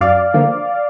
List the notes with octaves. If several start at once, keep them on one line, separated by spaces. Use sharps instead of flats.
F#2 D5 F5
D3 F3 A#3